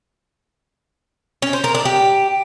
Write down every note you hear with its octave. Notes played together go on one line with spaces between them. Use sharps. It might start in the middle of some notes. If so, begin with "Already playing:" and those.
C#4
C5
A#4
D4
G4